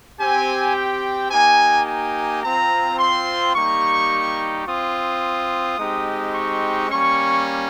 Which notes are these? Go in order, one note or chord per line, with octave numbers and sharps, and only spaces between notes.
C4 G4 G#5
G5
A#3 D#4 G4 G#5
G#5
C4 F4 A#5
C6
G3 A#3 D#4 G4 C#6
C4 F4 D#6
G#3 C4 D#4 G4
C#6
G3 A#3 C#4 C#6